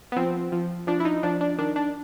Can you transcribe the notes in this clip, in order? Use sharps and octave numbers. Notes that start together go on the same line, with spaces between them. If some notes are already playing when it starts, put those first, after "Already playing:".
B3
F3 C4
F3
F3 D4
E4
D#4
F3 D4
D4
D#3 D4
D4